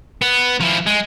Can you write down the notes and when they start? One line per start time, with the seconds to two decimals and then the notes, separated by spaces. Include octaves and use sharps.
0.22 B3
0.61 F3 E4
0.87 G#3